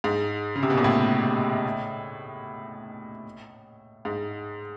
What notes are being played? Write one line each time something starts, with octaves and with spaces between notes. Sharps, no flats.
G#2
C#3
C3
B2
A#2
A2
G#2